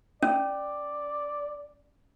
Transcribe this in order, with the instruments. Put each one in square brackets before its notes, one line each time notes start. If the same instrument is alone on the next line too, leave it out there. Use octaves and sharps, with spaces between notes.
[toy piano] C#4 [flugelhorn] D5